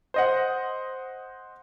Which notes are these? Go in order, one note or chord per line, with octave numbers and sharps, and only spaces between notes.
C5 D#5 F#5